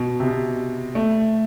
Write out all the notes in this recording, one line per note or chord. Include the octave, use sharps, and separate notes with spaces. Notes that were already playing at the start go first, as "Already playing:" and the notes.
Already playing: B2
C3
B2
A3